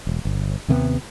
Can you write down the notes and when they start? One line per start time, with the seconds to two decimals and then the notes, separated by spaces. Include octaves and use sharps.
0.07 E1
0.25 G1
0.68 D#2 C3 A3 B3